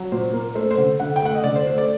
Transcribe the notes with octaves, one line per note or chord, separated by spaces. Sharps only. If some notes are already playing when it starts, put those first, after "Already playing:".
Already playing: F#3
A#2 C5
A#3
A3 C5
C5
D3
D3 F#5
G5
A3 F#5
D#5
D3 D5
C5
A3 C5
D5